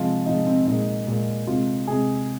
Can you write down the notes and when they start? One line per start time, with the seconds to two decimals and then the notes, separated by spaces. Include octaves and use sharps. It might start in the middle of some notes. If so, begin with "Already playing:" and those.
Already playing: C3 F3 G#3 F4
0.26 C3 F3 G#3 D#4
0.47 C4
0.67 A#2 G#3 D#4
1.07 A#2 G#3
1.47 C3 G#3 F4
1.87 C3 G#3 G#4